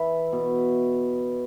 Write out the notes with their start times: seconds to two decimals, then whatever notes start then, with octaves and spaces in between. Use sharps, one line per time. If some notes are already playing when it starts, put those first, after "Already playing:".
Already playing: E3
0.32 B2